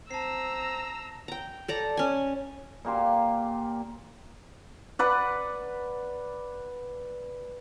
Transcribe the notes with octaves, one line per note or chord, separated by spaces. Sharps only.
C4 A5 A#5 E6 C7
G5 A#5
A4 D5 A#5
C#4 G#5
A#2 A#3 G4 C6
B4 D5 F#5